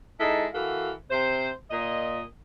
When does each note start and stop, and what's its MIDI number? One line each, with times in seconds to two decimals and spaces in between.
0.19 0.45 56
0.19 0.45 63
0.19 0.45 64
0.19 0.45 69
0.53 0.90 52
0.53 0.90 66
0.53 0.90 69
0.53 0.90 70
0.53 0.90 77
1.09 1.49 48
1.09 1.49 72
1.70 2.22 46
1.70 2.22 75